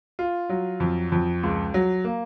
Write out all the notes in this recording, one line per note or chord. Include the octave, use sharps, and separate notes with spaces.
F4
F#3
F2
F2
C#2
F#3
A#3